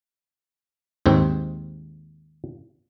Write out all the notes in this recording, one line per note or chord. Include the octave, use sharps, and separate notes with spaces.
D#2 G#2 C4